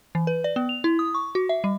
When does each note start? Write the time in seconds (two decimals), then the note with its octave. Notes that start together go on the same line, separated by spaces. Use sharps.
0.15 E3
0.27 B4
0.44 D5
0.56 B3
0.69 F7
0.84 E4
0.99 D#6
1.14 C#6
1.35 F#4
1.49 E5
1.64 G3